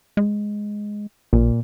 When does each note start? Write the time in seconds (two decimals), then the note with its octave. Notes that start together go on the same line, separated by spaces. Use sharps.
0.17 G#3
1.33 A#1 A#2